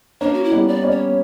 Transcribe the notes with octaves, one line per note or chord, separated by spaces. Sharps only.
A#3 C#4 D4
F#4
E4
G3 B3
D5
A#3 C#4
C#5
A#3